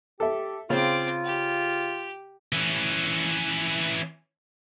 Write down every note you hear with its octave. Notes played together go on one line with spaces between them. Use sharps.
G4 A4 E5
C#3 C4 F4 D6
G4
E3 C#4